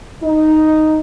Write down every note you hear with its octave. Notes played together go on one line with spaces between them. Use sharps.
D#4